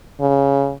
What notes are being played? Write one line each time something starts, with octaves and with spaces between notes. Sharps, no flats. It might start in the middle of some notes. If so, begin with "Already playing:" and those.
C#3